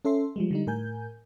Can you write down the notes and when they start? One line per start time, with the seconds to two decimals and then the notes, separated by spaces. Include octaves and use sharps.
0.05 C#4 A4 E5 C6
0.36 F3 G3 G#3
0.51 D3 G3 D#4
0.67 A2 A#4 G#5 G6